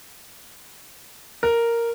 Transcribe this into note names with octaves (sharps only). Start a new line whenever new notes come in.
A#4